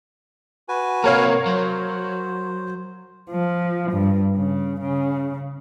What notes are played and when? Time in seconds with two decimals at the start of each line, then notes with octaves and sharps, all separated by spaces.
0.69 F#4 B4 G#5
1.04 C3 A#3 A#4 C#5 F5
1.46 F#3 C5
3.30 F3
3.92 G2
4.37 C#3
4.81 C#3